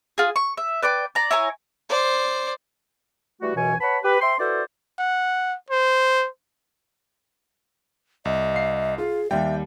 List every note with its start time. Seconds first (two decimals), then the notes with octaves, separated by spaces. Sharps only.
0.18 F4 G#4
0.36 C#6
0.57 E5
0.83 B4 D5 G5 D6
1.15 D5 A#5
1.31 E4 C#5 G#5 A#5
1.89 C5 D5
3.41 E3 G3 A3 F#4
3.55 C#2 F#2 B2 E3 C#5 G#5
3.81 B4 C#5 F#5 A5 B5
4.03 G4 B4
4.20 C5 E5 G5 C6
4.39 E4 F#4 A4 B4 C5 D5
4.99 F#5
5.70 C5
8.25 C2 D#5
8.54 F5 C7
8.98 F4 G#4
9.31 D#2 G3 E5 G5